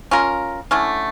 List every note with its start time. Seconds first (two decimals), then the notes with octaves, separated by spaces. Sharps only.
0.11 C#4 F4 A#4
0.71 D3 A3 C#4 E4